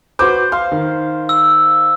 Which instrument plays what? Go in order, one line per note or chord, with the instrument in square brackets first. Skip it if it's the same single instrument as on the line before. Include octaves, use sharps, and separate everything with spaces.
[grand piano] F#4 B4 D6 [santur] C5
[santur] F5 [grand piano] C6
[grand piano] D#3
[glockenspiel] E6